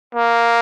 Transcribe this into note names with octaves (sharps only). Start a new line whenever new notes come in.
A#3